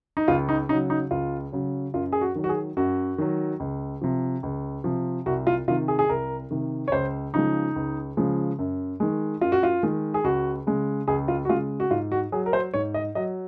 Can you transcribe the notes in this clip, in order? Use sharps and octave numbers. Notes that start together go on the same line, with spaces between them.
D#4
C#2 F4
D#4
C#3 F#3 D#4
D#4
C#2 F4
C#3 F#3
F#2 F4
G#4
F#4
D#3 F#3
F#4
G#4
F#2 F#4
D#3 F#3
C#2
C3 F3
C#2
C3 F3
C2 F#4
F4
C3 D#3 F4
G#4
G#4
C2 A#4
C3 D#3
C#5
C#2 C5
C#3 F3 G#3 D#4
C#2
C#3 F3 G#3
F#2
D#3 G#3
F#2 F4
F#4
F4
D#3 G#3
G#4
C#2 F#4
C#3 G#3
C#2 G#4
F4
F#4
C#3 G#3 F4
F#4
G#2 F4
F#4
F#3 G#4
A#4
C5
G#2 C#5
D#5
F#3 D#5